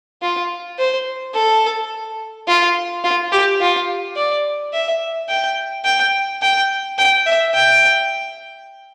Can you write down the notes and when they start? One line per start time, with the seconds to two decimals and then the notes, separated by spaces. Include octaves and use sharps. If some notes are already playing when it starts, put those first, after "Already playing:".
0.22 F4
0.78 C5
1.34 A4
2.48 F4
3.04 F4
3.32 G4
3.61 F4
4.16 D5
4.73 E5
5.29 G5
5.85 G5
6.42 G5
6.98 G5
7.26 E5
7.54 G5